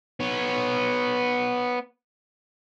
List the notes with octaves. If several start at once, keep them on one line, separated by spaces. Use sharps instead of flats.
B3 C#5